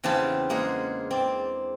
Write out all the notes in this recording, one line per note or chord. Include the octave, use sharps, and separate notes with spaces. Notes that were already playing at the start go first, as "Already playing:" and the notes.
E2 C#3 C4 D4 G4 A5
G#3 A#3 G#4 F#5
C4 D5